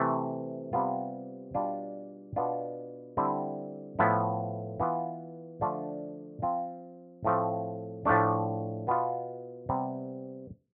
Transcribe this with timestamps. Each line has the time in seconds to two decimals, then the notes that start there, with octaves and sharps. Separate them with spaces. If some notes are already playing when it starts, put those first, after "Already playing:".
Already playing: C3 E3 A3
0.73 C3 G3 B3 F4
1.54 B2 G3 D4 F4
2.36 B2 B3 D4 F4
3.17 D3 G3 C4 E4
3.99 A2 F3 B3 E4
4.80 E3 B3 F4
5.61 D3 F3 A3 D4 F4
6.42 F3 C4 F4
7.25 A2 F3 A3 C4
8.05 A2 F3 A3 D4
8.87 B2 B3 F4
9.69 C3 G3 B3